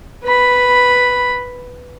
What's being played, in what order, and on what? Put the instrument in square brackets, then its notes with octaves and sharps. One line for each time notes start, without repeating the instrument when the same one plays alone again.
[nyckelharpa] B4 B5